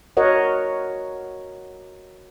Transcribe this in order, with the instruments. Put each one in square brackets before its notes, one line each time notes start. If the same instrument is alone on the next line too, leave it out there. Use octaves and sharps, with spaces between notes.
[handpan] F#4 A#4 C#5 D#5 F#5